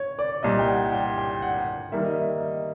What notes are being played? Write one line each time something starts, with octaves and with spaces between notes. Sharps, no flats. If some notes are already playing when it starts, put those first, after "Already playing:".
Already playing: C#5
D5
C2 A#2 G3 D#5
G5
F#5
F#5
G5
G5
F#5
D#3 G3 A#3 E5
D#5
E5
D#5